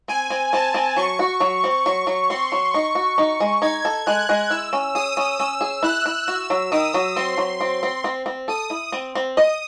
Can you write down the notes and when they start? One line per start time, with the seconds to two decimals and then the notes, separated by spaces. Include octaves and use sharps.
0.08 C4 G#5
0.30 C4
0.53 C4 A5
0.74 C4
0.96 F#3 C#6
1.19 F#4
1.40 F#3
1.64 C4
1.85 F#3 C#6
2.07 F#3
2.29 C4 C6
2.52 F#3
2.74 D#4 C#6
2.95 F#4
3.18 D#4
3.40 G#3
3.62 D#4 G#6
3.85 A4
4.06 G#3 F#6
4.29 G#3
4.50 E4 E6
4.73 C#4
4.95 G#4 D#6
5.17 C#4
5.39 C#4 E6
5.61 G#4
5.83 E4 F#6
6.06 E4
6.27 F#4 E6
6.50 F#3
6.72 D#3 D#6
6.94 F#3
7.16 C4 C6
7.38 F#3
7.61 C4
7.83 C4
8.04 C4
8.26 C4
8.48 A4 D#6
8.70 E4
8.92 C4
9.15 C4
9.37 D#5 D#6